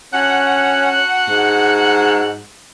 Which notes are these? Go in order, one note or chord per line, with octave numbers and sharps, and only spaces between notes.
C#4 D4 F#4 F#5
G#2